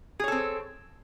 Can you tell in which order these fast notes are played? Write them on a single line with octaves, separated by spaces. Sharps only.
G#4 C#5 A4 C4